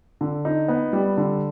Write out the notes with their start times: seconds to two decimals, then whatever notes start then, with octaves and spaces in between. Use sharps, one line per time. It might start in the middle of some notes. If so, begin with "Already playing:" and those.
0.21 D3
0.45 D#4
0.68 B3
0.93 G3
1.17 D3